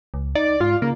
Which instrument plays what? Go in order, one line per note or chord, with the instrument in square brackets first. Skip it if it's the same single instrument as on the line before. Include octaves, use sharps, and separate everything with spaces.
[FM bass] C#2
[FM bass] D#4 [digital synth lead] D5
[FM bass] G#2 [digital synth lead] F4
[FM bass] C#3 [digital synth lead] A#3